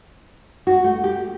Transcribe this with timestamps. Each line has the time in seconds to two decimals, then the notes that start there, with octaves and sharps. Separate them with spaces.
0.67 F#4
0.84 A3
1.04 G4